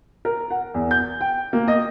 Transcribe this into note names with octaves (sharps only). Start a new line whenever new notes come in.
A#4
F#5
E2
G6
G5
A#3
D#5